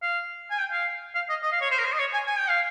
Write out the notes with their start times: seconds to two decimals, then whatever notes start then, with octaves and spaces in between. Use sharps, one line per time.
0.02 F5
0.51 G#5
0.59 G5
0.72 F5
1.15 F5
1.29 D#5
1.43 D#5
1.52 F5
1.61 C#5
1.71 C5
1.78 A#4
1.84 C5
1.93 D#5
1.99 C#5
2.13 G#5
2.27 G#5
2.38 G5
2.49 F5